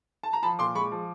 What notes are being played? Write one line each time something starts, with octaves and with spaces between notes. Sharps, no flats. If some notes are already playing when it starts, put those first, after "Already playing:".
A5
A#5
F3 A5 B5
A#2 C6 D6
G#3 B5 C#6
F3